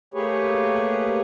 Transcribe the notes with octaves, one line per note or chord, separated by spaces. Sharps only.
A3 A#3 G4 G#4 B4 C#5